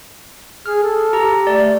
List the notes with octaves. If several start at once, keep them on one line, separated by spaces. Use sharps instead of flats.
G#4 F6
A4
G4 A#5
A3 D5